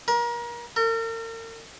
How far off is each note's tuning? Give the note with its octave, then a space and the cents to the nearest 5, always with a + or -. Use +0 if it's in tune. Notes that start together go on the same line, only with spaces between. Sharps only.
A#4 +35
A#4 -40